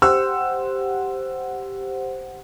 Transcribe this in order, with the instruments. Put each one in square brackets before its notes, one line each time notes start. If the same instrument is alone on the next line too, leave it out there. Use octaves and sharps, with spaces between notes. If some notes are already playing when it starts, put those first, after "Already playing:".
[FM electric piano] G4 C5 F#5 [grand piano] E6